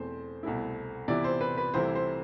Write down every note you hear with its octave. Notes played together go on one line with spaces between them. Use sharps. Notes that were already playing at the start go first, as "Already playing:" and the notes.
Already playing: E2 B2 A3 C4 C5
C2 B2 A3 E4
C3 E3 B3 E4 D5
C5
B4
B4
C2 C3 E3 A3 E4 C5
C5